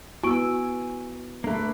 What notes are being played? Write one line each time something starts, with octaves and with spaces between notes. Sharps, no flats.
B3 E4 F#4 G#5 C#6 E6 D7
D3 A3 A#3 B4